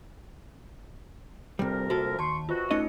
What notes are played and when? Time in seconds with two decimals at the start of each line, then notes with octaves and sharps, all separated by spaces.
1.59 D2 C3 F3 G3 A#4
1.90 C2 A#3 F#4 A4
2.19 D#2 A5 C6 C#6
2.49 C3 E3 F4 F#4
2.71 A3 C#4 D#4 F4 D#5 C#7